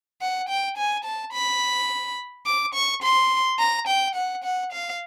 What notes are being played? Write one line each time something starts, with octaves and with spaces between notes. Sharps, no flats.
F#5
G5
G#5
A5
B5
D6
C#6
C6
A#5
G5
F#5
F#5
F5